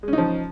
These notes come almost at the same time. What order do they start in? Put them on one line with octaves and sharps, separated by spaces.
G#3 C#4 D#4 F3